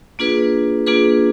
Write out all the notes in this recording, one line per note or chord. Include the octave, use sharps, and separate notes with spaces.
A#3 D4 F4 G#4 B4
A#3 D4 F4 G#4 B4